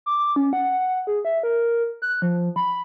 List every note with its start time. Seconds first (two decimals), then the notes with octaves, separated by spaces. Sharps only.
0.06 D6
0.36 C#4
0.53 F#5
1.07 G#4
1.25 E5
1.43 A#4
2.02 F#6
2.22 F3
2.56 B5